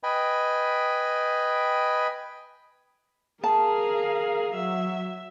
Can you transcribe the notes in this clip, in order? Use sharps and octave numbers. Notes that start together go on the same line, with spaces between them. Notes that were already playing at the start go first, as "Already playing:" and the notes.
B4 D#5 G5 G#5 B5
G#4 A#4 F5 A5
F#3 E5